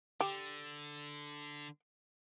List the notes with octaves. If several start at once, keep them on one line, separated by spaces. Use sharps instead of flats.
D3 G4